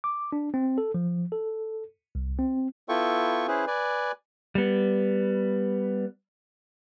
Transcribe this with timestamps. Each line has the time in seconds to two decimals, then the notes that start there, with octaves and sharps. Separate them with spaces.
0.04 D6
0.32 D4
0.54 C4
0.78 A4
0.94 F3
1.32 A4
2.15 C2
2.39 C4
2.89 B3 E4 F4 A4 G5 C#6
3.48 C#4 E4 G#4 B4 C5
3.67 B4 D5 G#5
4.55 G3 B3